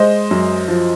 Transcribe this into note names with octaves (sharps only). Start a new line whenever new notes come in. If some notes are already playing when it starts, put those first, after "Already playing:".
Already playing: G#3 C5 D#5
F#2
F3